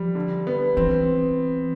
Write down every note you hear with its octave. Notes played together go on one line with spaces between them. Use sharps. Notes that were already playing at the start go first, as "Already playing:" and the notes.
Already playing: F3 G3
D3
B3
E3 C4